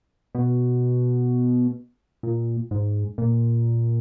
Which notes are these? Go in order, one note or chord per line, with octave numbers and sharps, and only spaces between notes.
B2
A#2
G#2
A#2